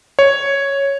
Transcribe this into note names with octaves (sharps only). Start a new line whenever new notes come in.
C#5